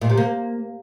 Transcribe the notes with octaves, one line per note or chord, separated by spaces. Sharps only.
A#2
C3
A#3